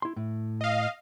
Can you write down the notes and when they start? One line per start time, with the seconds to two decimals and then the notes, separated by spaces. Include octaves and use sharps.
0.02 E4 C6
0.16 A2
0.61 D#5 F5